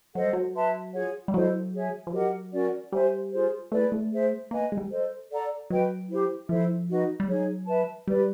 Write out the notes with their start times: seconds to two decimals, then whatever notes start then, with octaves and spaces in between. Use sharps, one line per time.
0.15 F#3 A4 C5 D#5 F#5
0.24 G3
0.33 F#3
0.54 B4 E5 A5 C6
0.94 F4 G#4 C#5 F#5
1.28 G3
1.34 F#3 E4 A4 C5 D#5
1.74 G#4 C#5 E5 G#5
2.07 F3
2.13 F#3 G4 A#4 D#5 F#5
2.52 C#4 F#4 A#4 D5
2.92 G3 C5 E5 G#5
3.32 F4 G#4 C5
3.71 A3 E4 G#4 B4 D5
3.92 A3
4.12 G#4 C5 E5
4.51 A#3 B4 D#5 G#5
4.72 G#3
4.77 G3
4.90 A4 C5 D#5
5.30 A4 D5 F#5 A#5
5.69 F#3 F#4 B4 D#5 G5
6.09 E4 G4 C5
6.49 F3 E4 A4 C5 E5
6.89 D#4 F#4 B4 D#5
7.20 G3
7.28 F#3 D#4 G#4 C#5
7.68 B4 E5 A5
8.07 G3 G4 B4 D5